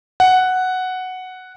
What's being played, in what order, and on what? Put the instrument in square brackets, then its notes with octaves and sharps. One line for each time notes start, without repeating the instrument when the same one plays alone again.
[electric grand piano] F#5